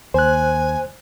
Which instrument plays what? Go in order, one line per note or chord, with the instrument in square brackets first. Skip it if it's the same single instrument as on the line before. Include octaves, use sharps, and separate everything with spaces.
[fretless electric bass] D#2 [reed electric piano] C5 F#6 [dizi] G#5